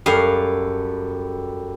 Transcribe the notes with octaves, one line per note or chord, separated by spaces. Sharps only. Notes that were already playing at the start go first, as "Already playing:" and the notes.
F#2 G3 A4 F5